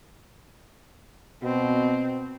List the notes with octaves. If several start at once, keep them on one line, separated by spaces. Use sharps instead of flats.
B2 C4